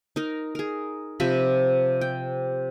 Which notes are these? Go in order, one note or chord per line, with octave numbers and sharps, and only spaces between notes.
D#4 A#4
G#4 A#4
C3 F3 G4 B5
G5